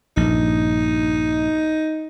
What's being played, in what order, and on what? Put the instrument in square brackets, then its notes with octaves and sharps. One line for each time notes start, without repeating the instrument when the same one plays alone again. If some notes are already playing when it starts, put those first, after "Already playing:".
[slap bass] A#1 G2 [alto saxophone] D#4